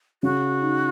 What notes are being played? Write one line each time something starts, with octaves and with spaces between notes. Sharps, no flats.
C#3 F#4
D#4